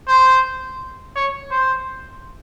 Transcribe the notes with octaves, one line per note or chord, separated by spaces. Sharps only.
C5
C#5
C5